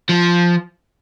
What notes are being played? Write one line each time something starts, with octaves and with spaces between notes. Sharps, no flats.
F3